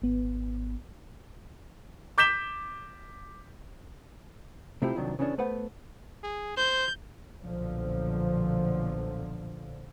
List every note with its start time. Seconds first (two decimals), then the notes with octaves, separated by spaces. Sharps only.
0.02 G#1 B3
2.18 D6 G6 B6 E7 G7
4.82 C3 A3 C4 E4 F4 G4
4.96 C2 C3 D#3 F3 F#3 D4
5.19 C#3 E3 B3 C#4 D4
5.38 A3 B3 B4 C5 F#5
6.23 G#4
6.57 C5 G6
7.40 B1 A#2 D3 F3